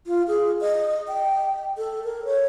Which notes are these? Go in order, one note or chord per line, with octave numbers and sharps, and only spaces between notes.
F4
G#4
D#5
G5
A4
A#4
C#5